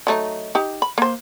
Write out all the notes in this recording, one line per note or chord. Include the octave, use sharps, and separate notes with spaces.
F#3 A3 D#4
D#4 G4
B5
A#3 C5